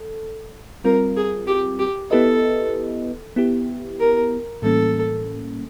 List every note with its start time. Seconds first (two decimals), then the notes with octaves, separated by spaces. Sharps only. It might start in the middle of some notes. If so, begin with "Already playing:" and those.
Already playing: A4
0.84 G3 C4 F4 A#4
1.16 G#4
1.47 G4
1.79 G4
2.10 B3 E4 G4 A4 B4 D#5
3.36 B3 E4 G4
4.00 A#4
4.62 A2 E3 G3 A#3 C#4 A4